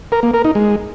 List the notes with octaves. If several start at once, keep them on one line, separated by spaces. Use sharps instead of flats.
A#4
A#3
A#4
D#4
G#3